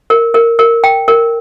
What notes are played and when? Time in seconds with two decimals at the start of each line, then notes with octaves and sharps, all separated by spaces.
0.10 A#4
0.34 A#4
0.59 A#4
0.84 G5
1.08 A#4